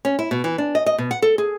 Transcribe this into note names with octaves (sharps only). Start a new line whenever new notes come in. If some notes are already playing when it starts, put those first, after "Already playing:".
C#4
E4
B2
E3
D4
D#5
D#5
B2
F#5
A4
G#4